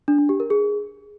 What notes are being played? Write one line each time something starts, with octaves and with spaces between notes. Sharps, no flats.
D4
D4
G4
A#4
G#4